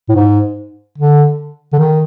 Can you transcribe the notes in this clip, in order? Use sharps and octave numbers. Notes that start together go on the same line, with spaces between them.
A2
G#2
D3
D3
D#3